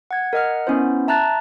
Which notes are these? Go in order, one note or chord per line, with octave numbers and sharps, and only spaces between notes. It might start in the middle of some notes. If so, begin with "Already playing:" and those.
F#5 G#6
A#4 D#5 F#5 F6
B3 C#4 E4 C5
E5 A5 A#5 F#6 A6